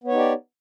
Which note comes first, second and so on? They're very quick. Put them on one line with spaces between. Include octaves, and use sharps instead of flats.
B3 C#5 D#4 G4 D5